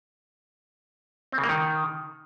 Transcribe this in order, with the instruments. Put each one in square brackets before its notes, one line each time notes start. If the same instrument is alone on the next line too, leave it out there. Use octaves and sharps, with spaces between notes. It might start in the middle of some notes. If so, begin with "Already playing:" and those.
[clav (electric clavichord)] C4
C#3
A#3
D#3